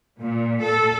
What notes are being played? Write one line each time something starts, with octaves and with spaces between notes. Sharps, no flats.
A#2
A4